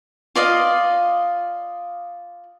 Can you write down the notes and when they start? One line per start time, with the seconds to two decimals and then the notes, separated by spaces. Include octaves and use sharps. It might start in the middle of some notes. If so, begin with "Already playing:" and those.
0.35 F4 D5 D#5 F5